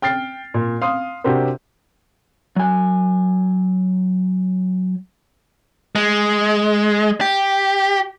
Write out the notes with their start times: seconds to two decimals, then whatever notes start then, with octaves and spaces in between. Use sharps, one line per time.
0.02 G5 F6 A6 C7
0.54 A#2
0.82 F5 C6 D#6
1.24 C3 D4 F#4 G4 A#4 C5
2.56 F#3 G#5
5.95 G#3
7.21 G4